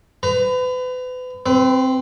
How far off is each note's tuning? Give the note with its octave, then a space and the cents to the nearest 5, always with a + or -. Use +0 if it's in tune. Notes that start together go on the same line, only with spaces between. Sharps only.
B4 +35 A#5 +0
C4 +0 B4 +40